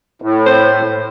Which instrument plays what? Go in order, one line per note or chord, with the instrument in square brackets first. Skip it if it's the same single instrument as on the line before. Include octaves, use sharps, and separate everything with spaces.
[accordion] A2
[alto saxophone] C5